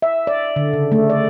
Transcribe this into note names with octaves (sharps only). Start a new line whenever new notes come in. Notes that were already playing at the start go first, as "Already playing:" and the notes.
E5
D5
D3
C#3
A3
D5